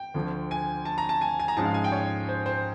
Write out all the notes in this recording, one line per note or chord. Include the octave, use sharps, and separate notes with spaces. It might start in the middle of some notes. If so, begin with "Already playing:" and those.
Already playing: G5
D2 D3 F3
G#5
A5
A#5
A5
G#5
G#5
A#5
G#2 F3 G#3 C#4 A5
F5
G#5
G5
C#5
C5
C5